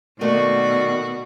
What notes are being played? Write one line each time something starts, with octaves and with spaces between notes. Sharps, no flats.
B2 D#3 A3 A#3 F#4 D5